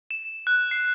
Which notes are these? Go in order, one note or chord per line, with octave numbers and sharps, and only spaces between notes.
E7
F#6
C7